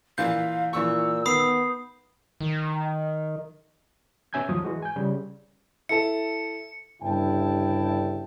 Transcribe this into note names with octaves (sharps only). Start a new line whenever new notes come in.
A#2 E3 F5 G6
A#2 E3 C#6 E6
D#3 B3 B5 D#6 C7
D#3
B2 C#4 E5 G#5 G6 G#6
D#2 F3 F#3 D#6
E3 G#3 F#4
G#5 G6
C#3 G3
E4 A4 A5 C#7
G1 G2 C#3 E4 G5 A5